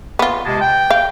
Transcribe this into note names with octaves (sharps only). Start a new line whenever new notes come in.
B3 F4
C3 G#3 A5
G5
F5